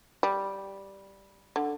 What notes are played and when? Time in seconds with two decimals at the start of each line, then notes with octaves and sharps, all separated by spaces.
0.23 G3
1.56 D3